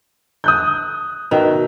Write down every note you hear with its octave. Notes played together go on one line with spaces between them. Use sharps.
D#6 F#6 G6
B2 D#3 E5